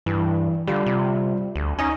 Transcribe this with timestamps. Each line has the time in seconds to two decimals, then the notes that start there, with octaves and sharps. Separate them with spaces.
0.06 G2 E3
0.67 D3 G3 F4
0.86 C3
1.56 D2
1.79 C#4 D#4 D#5 G#5